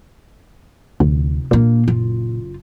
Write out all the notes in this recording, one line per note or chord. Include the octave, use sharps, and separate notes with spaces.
F1 D2
A#2 A#3 D4
F#1 F4